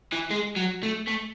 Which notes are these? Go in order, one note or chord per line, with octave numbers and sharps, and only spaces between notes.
E3
G#3
F#3
A3
A3